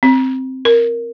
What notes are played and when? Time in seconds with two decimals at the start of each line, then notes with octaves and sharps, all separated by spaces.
0.03 C4
0.65 A#4